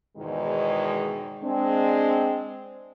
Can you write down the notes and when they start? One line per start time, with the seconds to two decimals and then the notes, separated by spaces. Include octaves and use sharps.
0.17 E2 G#2 B2 D#3 G#3
1.43 G#3 C4 D4